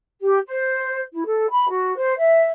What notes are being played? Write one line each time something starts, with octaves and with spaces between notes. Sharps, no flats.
G4
C5
E4
A4
B5
F#4
C5
E5